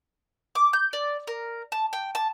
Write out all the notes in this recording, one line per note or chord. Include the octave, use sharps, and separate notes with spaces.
D6
G6
D5
A#4
A5
G5
A5